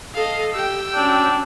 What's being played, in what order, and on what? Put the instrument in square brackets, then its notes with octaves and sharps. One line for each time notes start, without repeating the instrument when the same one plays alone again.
[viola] A4 D#5 [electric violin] F5
[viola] G4 [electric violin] G5 E6
[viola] C#4 F#4 [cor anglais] D4